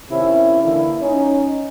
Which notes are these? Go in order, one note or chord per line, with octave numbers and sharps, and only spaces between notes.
C3 D#3 C#4 E4
D3 E3 A#3 E4
C#4 D#4